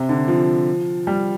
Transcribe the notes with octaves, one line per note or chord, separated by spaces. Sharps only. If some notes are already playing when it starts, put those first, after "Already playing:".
Already playing: C3
D3
F3
G3